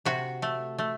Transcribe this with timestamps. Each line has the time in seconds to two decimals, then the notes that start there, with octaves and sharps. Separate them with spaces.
0.05 C3 F#4
0.42 A3
0.78 A3